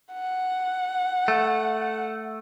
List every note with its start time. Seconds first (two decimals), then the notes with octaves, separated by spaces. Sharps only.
0.14 F#5
1.28 A3